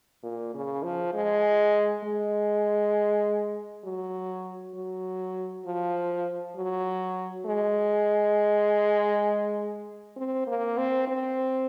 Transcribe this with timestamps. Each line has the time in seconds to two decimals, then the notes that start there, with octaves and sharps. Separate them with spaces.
0.23 A#2
0.54 C#3
0.83 F3
1.14 G#3
2.04 G#3
3.84 F#3
4.75 F#3
5.66 F3
6.56 F#3
7.46 G#3
10.16 C4
10.47 A#3
10.77 C4
11.07 C4